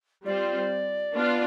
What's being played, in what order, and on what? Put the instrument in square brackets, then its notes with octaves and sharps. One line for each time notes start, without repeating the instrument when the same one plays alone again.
[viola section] G3 C4 F4 C5 [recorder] D5
[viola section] B3 D4 F4